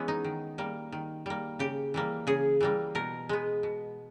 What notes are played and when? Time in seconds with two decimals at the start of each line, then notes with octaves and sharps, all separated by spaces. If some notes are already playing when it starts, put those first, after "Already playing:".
Already playing: E3 G#3 B3 C#4
0.08 D#4
0.24 D#3
0.58 G3 A#3
0.92 D#3
1.26 G3 A#3
1.59 C#3 G4
1.94 E3 G3 A#3
2.27 C#3 G#4
2.61 E3 G3 A#3
2.95 B2 A#4
3.29 G#3 B3
3.63 B2